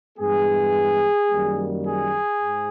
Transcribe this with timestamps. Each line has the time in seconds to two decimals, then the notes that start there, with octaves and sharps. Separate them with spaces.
0.17 G2 E3 G#3 B3 G#4
1.29 F#2 D#3 G3 A#3
1.85 G#4
2.41 G#2